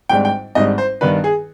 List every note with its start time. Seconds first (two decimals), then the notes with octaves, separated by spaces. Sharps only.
0.09 G#1 G#2 G3 D4 G5
0.25 G5
0.55 G#1 G#2 G3 D4 D#5
0.78 C5
1.01 G2 D#3 B3 D4 B4
1.24 G#4